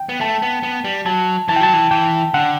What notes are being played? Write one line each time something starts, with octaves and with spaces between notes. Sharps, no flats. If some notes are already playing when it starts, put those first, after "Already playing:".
Already playing: G5
B3
A3 A5
B3
B3
G3
F#3 A5
E3 A5
G5
F#3 A5
E3
E3 G5
D3 F#5